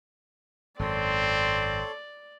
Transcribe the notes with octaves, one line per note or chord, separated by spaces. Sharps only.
G#1 F#2 C4 A4 C#5 D5 C6